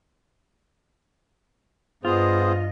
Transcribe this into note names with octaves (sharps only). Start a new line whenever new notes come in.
G2 B3 F4 G#4 C5 D#5